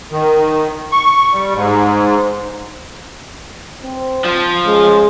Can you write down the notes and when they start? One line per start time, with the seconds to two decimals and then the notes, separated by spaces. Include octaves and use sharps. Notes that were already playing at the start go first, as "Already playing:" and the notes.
0.11 D#3
0.91 C#6
1.32 G3
1.54 G#2
3.84 C4
4.24 F3
4.66 C#3 G#3